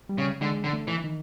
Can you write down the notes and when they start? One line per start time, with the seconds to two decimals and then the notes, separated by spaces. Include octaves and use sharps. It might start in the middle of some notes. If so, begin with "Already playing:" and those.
0.09 G3
0.18 C#3
0.41 D3 G#3
0.64 D3
0.73 A3
0.88 E3
1.04 D#3